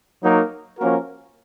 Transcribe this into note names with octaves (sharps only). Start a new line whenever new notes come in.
F#3 A#3 D#4 F#4 A#4
F3 A#3 C#4 F#4 A#4